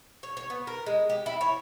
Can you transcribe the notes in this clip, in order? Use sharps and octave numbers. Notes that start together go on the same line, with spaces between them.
C#5
C#5
B3
A#4
G#3
G4
E4
C#5